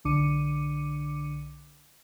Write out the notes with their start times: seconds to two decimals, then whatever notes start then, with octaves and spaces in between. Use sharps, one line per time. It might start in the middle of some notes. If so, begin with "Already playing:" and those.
0.05 B1 D3 D4 D6 C#7 D#7